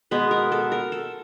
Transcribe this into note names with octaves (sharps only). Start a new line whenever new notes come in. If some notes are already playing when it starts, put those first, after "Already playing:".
B2 G#3 B3 B4
A#4
A4
A#4
A4